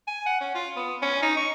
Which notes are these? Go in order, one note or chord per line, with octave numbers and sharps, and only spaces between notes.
G#5
F#5
C#4
F4
B3
C#4
D#4
C#6